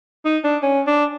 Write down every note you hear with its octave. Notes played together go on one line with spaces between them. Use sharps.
D#4
D4
C#4
D4